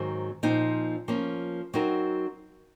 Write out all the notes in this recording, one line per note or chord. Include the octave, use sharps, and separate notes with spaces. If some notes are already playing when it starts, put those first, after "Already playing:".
Already playing: G#2 D#3 F#3 C4
A#2 F3 C4 D#4
F3 A#3 C#4
F#3 C4 D#4 F#4 A#4